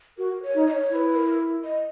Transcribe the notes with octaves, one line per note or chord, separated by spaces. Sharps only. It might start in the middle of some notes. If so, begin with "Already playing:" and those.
F#4 A#4
C#5
D#4
D#5
C#5
E4 B4 C#5
A#4
D#5